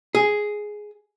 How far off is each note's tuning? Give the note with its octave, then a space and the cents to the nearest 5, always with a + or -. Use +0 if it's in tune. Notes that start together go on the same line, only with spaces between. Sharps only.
G#4 +5